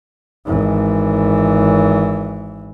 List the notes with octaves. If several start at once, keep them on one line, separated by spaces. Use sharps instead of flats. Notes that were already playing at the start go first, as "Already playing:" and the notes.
G#1 E3